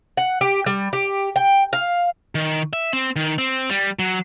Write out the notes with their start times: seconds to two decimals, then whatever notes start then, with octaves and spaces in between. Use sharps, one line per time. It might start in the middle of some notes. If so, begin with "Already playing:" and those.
0.17 F#5
0.41 G4
0.66 G3
0.93 G4
1.36 G5
1.73 F5
2.35 D#3
2.73 E5
2.93 C4
3.16 D#3
3.38 C4
3.70 G3
3.99 F#3